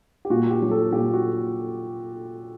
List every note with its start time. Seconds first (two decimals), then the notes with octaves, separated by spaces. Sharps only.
0.25 G4
0.30 A#2 F#4
0.50 G4
0.62 F#3
0.71 A4
0.92 A#2 G4
1.13 F#4